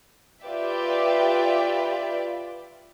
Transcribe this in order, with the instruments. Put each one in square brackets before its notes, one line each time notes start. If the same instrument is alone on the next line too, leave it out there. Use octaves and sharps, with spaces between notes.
[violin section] F4 G4 B4 D5 E5